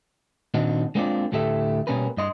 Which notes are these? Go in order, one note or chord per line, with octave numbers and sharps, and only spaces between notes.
A#2 D#3 C4 D4 D#4 F#4
G#3 A#3 C4 D4 F4 D5
D2 A2 A3 G4 A4 E5
B2 G3 A#3 C#4 A#4 B4
G2 D#5 C6